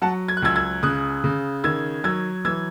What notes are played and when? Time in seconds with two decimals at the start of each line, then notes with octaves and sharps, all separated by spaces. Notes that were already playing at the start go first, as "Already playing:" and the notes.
0.02 F#3 F#5 A5
0.28 G#6
0.37 F#6
0.42 C#2 E6 G#6
0.56 E6 G#6
0.83 C#3 D#6 F#6
1.24 C#3
1.64 D#3 E6 G#6
2.04 F#3 E6 G#6
2.45 E3 E6 G#6